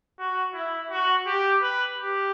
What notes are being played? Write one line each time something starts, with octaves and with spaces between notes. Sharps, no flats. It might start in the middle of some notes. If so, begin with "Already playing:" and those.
F#4
E4
F#4
G4
B4
G4